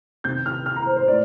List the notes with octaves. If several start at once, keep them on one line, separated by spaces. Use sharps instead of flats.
C3 D#3 G6
F6
F6
A#5
C5
C5
A2 D5